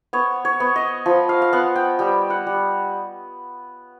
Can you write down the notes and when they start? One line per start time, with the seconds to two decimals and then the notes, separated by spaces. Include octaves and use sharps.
0.13 B3 C#5
0.45 C#5
0.60 B3
0.76 D#5
1.06 F3
1.29 F5
1.42 F5
1.53 B3 F#5
1.76 G5
1.99 G3 G5
2.30 F#5
2.47 G3